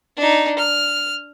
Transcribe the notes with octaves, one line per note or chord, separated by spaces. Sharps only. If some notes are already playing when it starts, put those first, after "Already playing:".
D4 D#4
F6